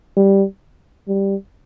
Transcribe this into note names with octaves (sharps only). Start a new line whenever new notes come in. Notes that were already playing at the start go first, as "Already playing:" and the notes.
G3
G3